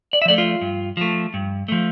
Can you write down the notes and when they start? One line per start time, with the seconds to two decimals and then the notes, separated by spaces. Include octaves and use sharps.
0.13 D5
0.22 E5
0.25 F3 A3 D5
0.38 F4
0.61 G2
0.97 F3 A3
1.34 G2
1.68 F3 A3